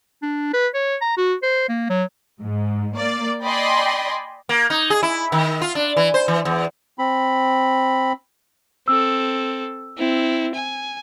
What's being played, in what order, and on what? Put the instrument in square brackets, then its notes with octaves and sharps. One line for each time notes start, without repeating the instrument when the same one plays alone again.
[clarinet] D4
B4
C#5
A#5
F#4
C5
A#3
F#3
[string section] G#2
A#3 D5
D5 D#5 G5 G#5 B5 C6
[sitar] A#3
D#4
G#4
E4
D#3
F4
D4
E3
C5
E3
E2
[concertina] C4 B5
[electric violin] C4 A4 [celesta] E6
[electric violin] C4 E4
G#5